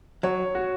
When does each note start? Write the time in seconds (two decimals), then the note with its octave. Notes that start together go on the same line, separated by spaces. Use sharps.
0.23 F#3 C#5
0.55 F#4